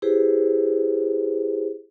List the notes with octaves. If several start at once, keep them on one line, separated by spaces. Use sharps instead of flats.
E4 G4 G#4 B4 C5